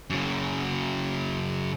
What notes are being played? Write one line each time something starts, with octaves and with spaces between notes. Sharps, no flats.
F#2 C#3